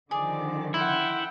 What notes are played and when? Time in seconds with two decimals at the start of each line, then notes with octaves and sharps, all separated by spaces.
0.11 D3 D#3 F3 G#4 D5 D6
0.74 E4 F#5 G5 C6